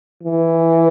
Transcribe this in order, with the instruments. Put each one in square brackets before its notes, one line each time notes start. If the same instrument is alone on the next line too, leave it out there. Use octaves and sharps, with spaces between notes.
[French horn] E3